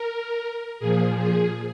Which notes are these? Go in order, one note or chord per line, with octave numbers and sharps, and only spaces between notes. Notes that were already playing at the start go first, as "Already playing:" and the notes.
Already playing: A#4
A#2 F3 G#4
G#4